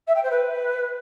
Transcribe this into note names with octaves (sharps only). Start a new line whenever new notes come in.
E5
G5
C5
B4